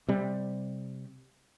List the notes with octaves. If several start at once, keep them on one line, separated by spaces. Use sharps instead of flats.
C3 G3